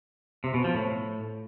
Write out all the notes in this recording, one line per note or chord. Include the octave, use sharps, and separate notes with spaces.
C3
B2
F3
A2